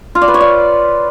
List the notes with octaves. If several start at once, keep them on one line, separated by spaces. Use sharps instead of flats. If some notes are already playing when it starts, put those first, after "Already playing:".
F4
D5
B4
C#5
D5